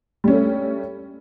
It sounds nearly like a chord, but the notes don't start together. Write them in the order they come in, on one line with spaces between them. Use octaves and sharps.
G3 C#4 A3